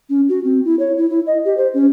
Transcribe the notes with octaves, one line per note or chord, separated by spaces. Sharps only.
C#4
F#4
C4
E4
C#5
E4
E4
D#5
G4
C5
C#4